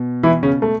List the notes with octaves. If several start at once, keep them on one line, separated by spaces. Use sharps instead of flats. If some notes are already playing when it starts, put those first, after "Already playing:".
Already playing: B2
E3 E4
C#3 C#4
A3